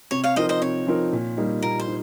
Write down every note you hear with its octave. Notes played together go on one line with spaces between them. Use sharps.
C3 C#5
C#5 F5
F3 C4 D#4 A#4 C5 D#5
C5 D#5
C3 C#5
F3 C4 D#4 A#4
A#2
G3 A#3 D#4
A#2 A#4
C5
D#4